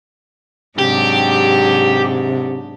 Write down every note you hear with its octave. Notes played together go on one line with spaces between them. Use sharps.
G#2 C3 F#3 D4 G4